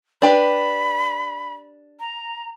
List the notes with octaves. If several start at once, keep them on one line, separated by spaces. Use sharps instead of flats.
D4 G4 B4 B5
A#5